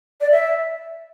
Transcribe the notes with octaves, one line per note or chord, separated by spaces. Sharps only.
D5
E5